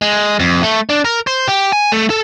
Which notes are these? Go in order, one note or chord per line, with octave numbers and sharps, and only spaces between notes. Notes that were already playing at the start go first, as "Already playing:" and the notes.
G#3
F2
A3
D4
A#4
C5
G4
G#5
A3
A4